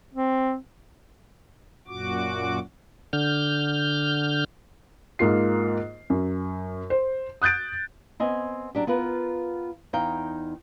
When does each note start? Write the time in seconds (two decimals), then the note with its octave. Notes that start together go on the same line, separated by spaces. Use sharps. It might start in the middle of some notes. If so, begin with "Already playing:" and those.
0.14 C4
1.88 F#2 A#2 F#4 D6
3.13 D3 F6 G6
5.19 G#2 A#3 F4 C7
6.10 F#2
6.90 C5
7.42 D#6 F#6 G6 A6 D7
8.20 B3 C4 D#5 G#5
8.75 F#3 D4 G4
8.87 B3 F4 A#4 B4
9.93 E2 D#4 F5 G5